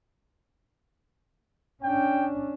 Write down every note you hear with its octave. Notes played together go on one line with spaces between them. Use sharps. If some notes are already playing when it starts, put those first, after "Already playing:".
C#4 D4 G5